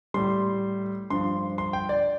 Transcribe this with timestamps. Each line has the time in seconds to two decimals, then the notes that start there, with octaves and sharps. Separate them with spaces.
0.14 A2 G3 C6
1.10 G2 F3 C6
1.58 C6
1.73 G5
1.89 D5